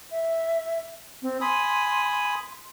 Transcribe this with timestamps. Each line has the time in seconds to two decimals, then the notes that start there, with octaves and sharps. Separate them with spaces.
0.11 E5
1.22 C4
1.41 G#5 B5 C6 D#6